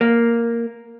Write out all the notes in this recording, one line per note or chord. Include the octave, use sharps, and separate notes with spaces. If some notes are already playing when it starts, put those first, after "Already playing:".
A#3